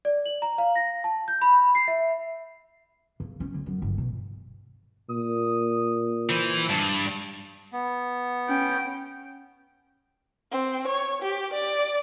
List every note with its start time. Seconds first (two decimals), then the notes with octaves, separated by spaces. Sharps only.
0.05 D5
0.26 F#7
0.42 A#5
0.58 F5
0.75 A#6
1.04 A5
1.28 G6
1.42 B5
1.75 C7
1.88 E5
3.20 C#3
3.40 C#4
3.54 D2
3.66 F#2
3.82 G1
3.98 B2
5.09 A#2 D#6
6.30 E3 C5
6.69 G2 A5
7.73 B3
8.49 C#4 G5
10.51 C4
10.87 C#5
11.22 G4
11.53 D5